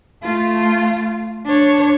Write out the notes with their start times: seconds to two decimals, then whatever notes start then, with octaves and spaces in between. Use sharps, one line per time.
0.23 A3 F4
1.45 D4 C#5